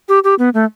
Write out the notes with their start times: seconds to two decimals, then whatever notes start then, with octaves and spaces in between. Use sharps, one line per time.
0.09 G4
0.24 G4
0.39 B3
0.54 A3